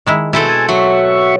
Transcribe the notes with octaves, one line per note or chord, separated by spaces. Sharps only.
D#3 G#3 E4
B2 C4 E4 A4
G#5 A5
F#3 F#4 E5 C#6